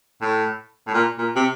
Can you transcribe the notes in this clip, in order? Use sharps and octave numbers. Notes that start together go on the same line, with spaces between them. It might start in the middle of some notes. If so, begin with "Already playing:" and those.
A2
A2
A#2
A#2
C3